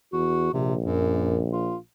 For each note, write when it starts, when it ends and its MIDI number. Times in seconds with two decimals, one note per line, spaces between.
0.13 0.50 40
0.13 0.52 66
0.53 1.76 34
0.53 0.75 48
0.85 1.39 42
1.53 1.77 65